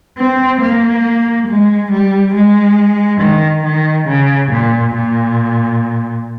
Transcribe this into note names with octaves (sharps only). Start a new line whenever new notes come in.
C4
A#3
G#3
G3
G#3
D#3
D#3
C#3
A#2
A#2